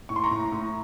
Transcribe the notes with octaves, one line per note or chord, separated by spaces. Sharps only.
A2 C#6
C6
A#5 C#6
A2
A2